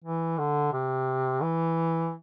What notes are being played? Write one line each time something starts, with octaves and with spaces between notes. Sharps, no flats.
E3
D3
C3
E3